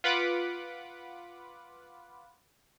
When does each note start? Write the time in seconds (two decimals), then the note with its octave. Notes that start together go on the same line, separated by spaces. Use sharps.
0.04 F4 B4 F#5 B5 D6